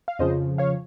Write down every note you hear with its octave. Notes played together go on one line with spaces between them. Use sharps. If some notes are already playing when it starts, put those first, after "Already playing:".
F5
F2 C#3 F3 C5 D#5
C#5 F5